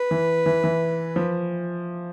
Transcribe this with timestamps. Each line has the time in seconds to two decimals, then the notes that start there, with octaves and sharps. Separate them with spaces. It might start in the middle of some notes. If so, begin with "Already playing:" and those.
Already playing: B4
0.11 E3
0.46 E3
0.64 E3
1.16 F3